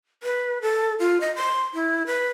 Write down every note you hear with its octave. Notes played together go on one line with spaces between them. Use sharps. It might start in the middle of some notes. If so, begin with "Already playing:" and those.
B4
A4
F4
D#5
C6
E4
B4